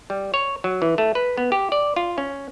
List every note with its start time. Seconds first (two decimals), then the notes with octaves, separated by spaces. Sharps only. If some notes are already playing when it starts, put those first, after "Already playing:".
0.10 G3
0.34 C#5
0.64 F#3
0.82 E3
0.98 A3
1.15 B4
1.38 B3
1.52 G4
1.72 D5
1.96 F4
2.18 C#4